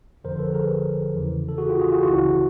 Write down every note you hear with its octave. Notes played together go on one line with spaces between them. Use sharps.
G1 F2 D3 F3 A#4 C5
A4 B4
G#4 A#4
E2 C#3 E3
A4
F#4 G#4
F4 G4
F#4 G#4
F4 G4
C#2 C#3 E3 E4 F#4